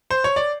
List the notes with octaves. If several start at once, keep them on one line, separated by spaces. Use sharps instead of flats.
C5
C#5
D5